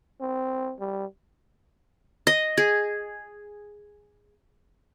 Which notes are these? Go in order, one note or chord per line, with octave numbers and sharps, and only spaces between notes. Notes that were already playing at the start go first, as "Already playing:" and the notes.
C4
G3
D#5
G#4